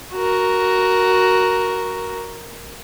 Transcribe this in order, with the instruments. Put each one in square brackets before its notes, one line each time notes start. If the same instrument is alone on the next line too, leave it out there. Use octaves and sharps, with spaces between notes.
[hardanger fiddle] F#4 A#4